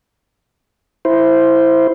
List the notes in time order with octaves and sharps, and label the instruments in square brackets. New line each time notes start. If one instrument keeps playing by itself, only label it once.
[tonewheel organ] E4 C5